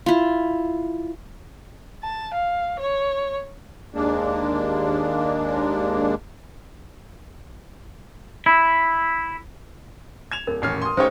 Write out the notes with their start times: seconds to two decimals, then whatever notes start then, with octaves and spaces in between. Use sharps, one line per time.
0.06 E4 F4
2.03 A5
2.34 F5
2.79 C#5
3.94 D#2 G#3 A#3 D4
8.46 E4
10.32 G#6 E7 F7
10.47 D1 A#4
10.62 D#1 A1 C#4 F6 C7
10.82 C6 D#6
10.97 C#3 A3 D#4 G4 C5 C#5